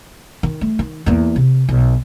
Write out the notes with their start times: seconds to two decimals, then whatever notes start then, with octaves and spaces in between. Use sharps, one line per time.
0.43 D#3
0.61 A3
0.79 D#3
1.06 E2 A#3
1.36 C3
1.69 B1